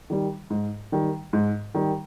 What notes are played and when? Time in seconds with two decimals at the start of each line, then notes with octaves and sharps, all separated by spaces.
0.10 D#3 G3
0.50 G#2
0.92 D#3 G3
1.33 G#2
1.75 D#3 G3